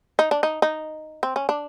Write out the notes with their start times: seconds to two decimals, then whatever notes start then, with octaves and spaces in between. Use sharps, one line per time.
0.19 D#4
0.31 D4
0.43 D#4
0.62 D#4
1.23 C4
1.36 C#4
1.49 D4